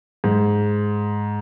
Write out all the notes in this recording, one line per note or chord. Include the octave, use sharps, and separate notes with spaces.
G#2